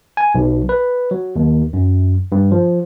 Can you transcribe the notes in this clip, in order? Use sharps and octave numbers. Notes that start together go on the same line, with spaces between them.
G#5
B1
B4
F#3
D#2
F#2
G2
F3